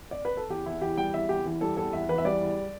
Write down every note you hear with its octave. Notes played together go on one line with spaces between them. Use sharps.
D5
B4
A4
E2 G4
E2 E4
E3 G4
G3 G5
E2 E5
E2 G4
E3
G3 A4
E2 A4
E2 E5
E3 B4
E5
G3 D5
E2